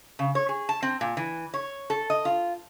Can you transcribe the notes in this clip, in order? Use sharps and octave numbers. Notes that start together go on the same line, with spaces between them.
C#3
C#5
G#4
A5
C4
A#2
E3
C#5
A4
D#5
F4